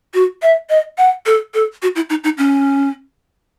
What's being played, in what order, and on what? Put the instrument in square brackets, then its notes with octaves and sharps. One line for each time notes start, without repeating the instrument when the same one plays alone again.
[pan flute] F#4
E5
D#5
F#5
A4
A4
F#4
E4
D#4
D#4
C#4